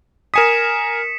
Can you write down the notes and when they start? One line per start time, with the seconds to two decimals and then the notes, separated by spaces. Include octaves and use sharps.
0.34 A#4 G#5 D#6 B6 C#7 E7